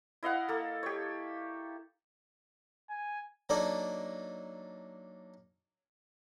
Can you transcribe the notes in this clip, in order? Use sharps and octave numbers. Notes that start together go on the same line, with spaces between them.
E4 D#5 F5 F#5
A#3 A4
G4 C#5
G#5
F#3 A#3 D4 D#4 A4 D5